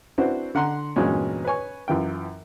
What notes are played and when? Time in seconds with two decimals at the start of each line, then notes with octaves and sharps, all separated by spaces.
0.18 C4 D4 E4 F#4 B4 C5
0.55 D3 F#5 A#5 C6
0.96 E2 G2 A#2 F#3 G#3 C#4
1.45 B4 C#5 G#5 C#6
1.88 F#2 E3 F4 G5